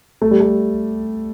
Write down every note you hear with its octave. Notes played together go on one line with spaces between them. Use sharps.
A3
G3
A3